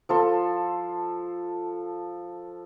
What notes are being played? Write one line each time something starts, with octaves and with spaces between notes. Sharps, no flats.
F3 A4 C6